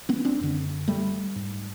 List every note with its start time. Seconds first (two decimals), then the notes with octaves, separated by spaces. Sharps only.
0.09 B3 C#4
0.25 C4 D4
0.41 F#2 D3
0.88 G3 A3
1.36 G#2